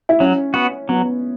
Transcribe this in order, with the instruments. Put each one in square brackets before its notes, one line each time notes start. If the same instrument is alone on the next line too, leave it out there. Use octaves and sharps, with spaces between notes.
[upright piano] E4
[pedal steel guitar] F#3 [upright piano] C#4
[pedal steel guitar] B3 F#4
[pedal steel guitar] F#3 [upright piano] B3